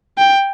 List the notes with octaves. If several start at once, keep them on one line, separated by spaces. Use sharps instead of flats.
G5